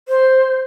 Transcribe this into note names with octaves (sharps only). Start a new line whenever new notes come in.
C5